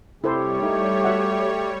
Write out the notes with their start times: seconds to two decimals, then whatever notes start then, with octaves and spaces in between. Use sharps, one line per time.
0.24 C3 G3 E4 G4 A4 C5 C#5
0.62 A3 D#4
1.04 F#4 E5 F#5